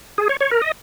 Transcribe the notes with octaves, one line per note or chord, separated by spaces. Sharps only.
G#4
C#5
C#5
A#4
D#5